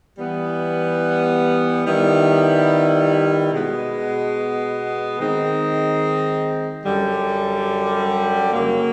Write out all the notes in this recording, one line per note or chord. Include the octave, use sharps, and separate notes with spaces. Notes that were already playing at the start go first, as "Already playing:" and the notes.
E3 G3 B3
D#3 G3 B3 E4
B2 G#3 B3
D#3 G#3 C4 D#4
F#2 D3 G3
C#3 F#3 A#3